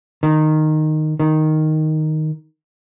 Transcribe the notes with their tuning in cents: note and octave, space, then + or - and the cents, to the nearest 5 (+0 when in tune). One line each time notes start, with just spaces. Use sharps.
D#3 -10
D#3 +0